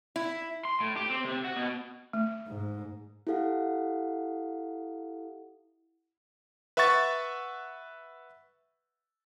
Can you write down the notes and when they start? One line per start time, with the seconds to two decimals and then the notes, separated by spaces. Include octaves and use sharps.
0.16 E4
0.65 C6
0.80 A2
0.96 G4
1.10 C4
1.25 C3
1.44 F#4
1.56 B2
2.13 A3
2.47 G#2
3.27 E4 G4 A4 F5 F#5
6.77 B4 E5 F#5 C#6 A6